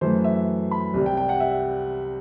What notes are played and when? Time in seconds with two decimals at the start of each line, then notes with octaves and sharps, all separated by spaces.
0.01 F#2 E3 A3 C5
0.24 E5
0.71 B5
0.94 C2 C3 G3
1.06 G5
1.17 G5
1.29 F#5
1.40 E5